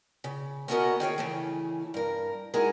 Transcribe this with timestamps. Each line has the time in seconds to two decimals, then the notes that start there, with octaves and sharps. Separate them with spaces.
0.24 C#3
0.68 A3 B3 C#4 F#4 A#4 D#5
1.00 D#3 G#4 C#5 G5
1.18 C#3 E3 A3
1.94 G2 A#4
2.54 G#3 D#4 E4 F#4 G#4 A#4